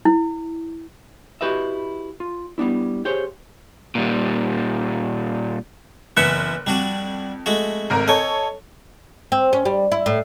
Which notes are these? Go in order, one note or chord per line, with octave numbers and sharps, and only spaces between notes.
E4
E4 F#4 G4 B4 D#5 E5
F4
G3 B3 D4 E4
G4 G#4 C5 C#5
A#2 G3
F#1 E3 B3 E5 F#6 C#7
F2 G3 D4 F#4
G#3 A3 F#4
G#1 A#4 A#5
A4 C#5 D#5 G#5
C4
C#4
G3
E4
A2